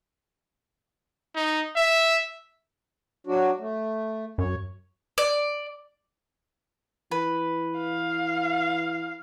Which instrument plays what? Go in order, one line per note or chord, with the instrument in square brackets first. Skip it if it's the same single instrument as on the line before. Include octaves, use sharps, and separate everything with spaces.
[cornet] D#4
E5
[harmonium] F#3 D4 F#4
A3
[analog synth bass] F#2 [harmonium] C#5
[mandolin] D5
[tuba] E3 [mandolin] B4
[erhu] F5